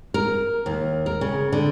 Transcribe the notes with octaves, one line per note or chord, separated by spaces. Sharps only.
A#4
D#2
A#4
C#3
D3